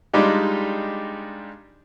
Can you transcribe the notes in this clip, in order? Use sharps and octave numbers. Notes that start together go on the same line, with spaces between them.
G3 G#3 D4 D#4 F4 G4